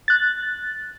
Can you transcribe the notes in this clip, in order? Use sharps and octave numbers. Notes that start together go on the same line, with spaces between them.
F#6 A6